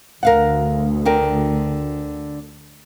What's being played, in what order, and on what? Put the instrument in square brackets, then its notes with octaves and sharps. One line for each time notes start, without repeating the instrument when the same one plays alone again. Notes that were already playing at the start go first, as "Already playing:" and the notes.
[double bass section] D2 [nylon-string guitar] A#4 F5 F#5
[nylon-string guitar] D3 A#4 G5